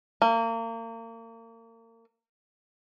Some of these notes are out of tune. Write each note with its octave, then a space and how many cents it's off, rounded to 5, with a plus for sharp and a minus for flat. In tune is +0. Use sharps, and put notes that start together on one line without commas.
A#3 -35